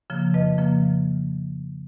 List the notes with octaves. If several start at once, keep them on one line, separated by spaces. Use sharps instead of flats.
C#3 F3 A#3
F2 B4 D#5
C#3 F3 A#3